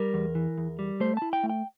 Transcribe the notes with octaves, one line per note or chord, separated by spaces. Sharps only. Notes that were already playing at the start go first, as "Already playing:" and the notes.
Already playing: G3 A#4
E2
E3
E2
G3
A3 C5
E4 A5
G5
A3
G5